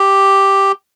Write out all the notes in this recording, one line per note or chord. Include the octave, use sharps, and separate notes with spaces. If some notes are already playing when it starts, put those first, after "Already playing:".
Already playing: G4